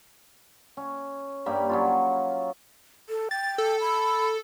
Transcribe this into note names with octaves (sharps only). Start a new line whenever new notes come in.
C#4
G2 G3 A#3 B5
F#3 C#4 F4
A4
G5 A6
A4
B5